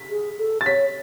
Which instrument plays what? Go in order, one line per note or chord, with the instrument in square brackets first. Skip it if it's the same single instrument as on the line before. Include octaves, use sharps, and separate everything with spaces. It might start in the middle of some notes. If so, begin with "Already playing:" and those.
Already playing: [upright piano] B6
[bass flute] G#4
A4
[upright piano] A6
[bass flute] C#5 [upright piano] B6